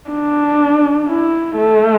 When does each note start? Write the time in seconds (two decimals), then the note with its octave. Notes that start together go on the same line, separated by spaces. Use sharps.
0.10 D4
1.08 E4
1.57 A3